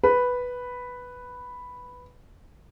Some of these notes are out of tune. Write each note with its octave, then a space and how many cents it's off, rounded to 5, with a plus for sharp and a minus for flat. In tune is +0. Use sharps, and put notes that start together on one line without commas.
B4 +0